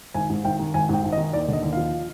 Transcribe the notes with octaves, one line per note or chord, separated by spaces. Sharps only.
G#1 G#5
G#2
G#1 G5
D#3
G#1 G#5
G#2 G5
G#1
D#5
D#3
D#2 D5
D3 D#5
D#2
F3 F5